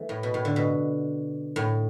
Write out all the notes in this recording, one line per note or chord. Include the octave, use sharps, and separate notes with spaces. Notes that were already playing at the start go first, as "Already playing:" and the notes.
Already playing: E3 A3
A2
B2
A2
D3
B2
A2